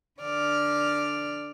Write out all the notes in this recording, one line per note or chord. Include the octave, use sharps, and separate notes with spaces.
D3 D5 F6